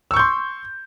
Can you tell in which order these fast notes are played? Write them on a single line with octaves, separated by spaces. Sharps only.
E6 C#6 G6 C6